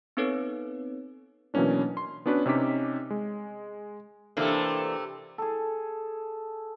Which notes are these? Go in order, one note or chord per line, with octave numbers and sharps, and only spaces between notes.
B3 C4 D#4 A4 B4 C#5
B2 E3 F#3 A#3 C#4 D4
C6
B3 C#4 D4 F#4 B4
C3 C#4 D#4 G4 D6 B6
G#3
C3 E3 A3 A#3 D4 A4
G#4 A4